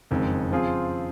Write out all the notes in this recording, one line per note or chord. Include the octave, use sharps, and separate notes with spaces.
F#1 F2 D#3 G#3
C#3 F3 C4 F4 G#4